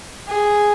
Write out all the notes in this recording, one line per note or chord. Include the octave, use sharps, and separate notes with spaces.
G#4